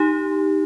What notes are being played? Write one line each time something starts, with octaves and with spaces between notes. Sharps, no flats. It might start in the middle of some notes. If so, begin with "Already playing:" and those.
Already playing: D#4 G4